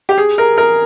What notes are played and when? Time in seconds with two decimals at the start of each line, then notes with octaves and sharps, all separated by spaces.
0.09 G4
0.18 G#4
0.38 A#4
0.58 A#4